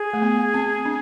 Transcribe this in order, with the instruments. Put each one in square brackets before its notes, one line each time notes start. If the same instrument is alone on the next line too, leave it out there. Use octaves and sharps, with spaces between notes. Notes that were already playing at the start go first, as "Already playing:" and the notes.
Already playing: [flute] G#4
[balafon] A3
B3
C4
D4